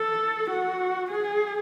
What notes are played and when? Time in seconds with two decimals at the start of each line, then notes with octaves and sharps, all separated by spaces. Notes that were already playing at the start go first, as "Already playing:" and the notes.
Already playing: A4
0.51 F#4
1.11 G#4